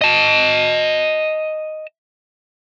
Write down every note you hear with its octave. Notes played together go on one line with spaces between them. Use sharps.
D#5 A5